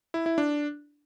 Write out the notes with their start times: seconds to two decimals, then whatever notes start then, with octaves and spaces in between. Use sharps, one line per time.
0.14 E4
0.26 E4
0.38 D4